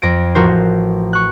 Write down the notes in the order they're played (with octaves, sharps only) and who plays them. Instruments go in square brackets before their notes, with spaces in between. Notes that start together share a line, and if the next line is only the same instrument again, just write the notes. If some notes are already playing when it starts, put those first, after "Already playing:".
[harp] F2 A#6 D7
A1 F3 F#4 A#4 C5
C#6 F#6